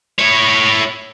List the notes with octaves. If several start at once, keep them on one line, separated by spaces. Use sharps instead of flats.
E4 C#5